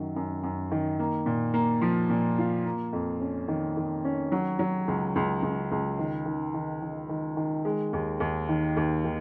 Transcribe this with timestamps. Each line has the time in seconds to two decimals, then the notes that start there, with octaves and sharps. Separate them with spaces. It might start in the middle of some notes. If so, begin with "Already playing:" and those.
Already playing: F#2 D#3 F#3
0.16 F#2
0.43 F#2
0.71 D#3
0.99 A#3
1.26 A#2
1.54 A#3
1.81 F3
2.10 A#2
2.38 F4
2.65 A#3
2.93 F2
3.21 C#4
3.48 D#3
3.77 D#3
4.04 C#4
4.32 F#3
4.59 F#3
4.88 C#2
5.16 C#2
5.43 C#2
5.71 C#2
5.99 D#3
6.26 D#3
6.54 D#3
6.82 D#3
7.09 D#3
7.37 D#3
7.65 G#3
7.93 D#2
8.20 D#2
8.49 D#3
8.77 D#2
9.05 D#3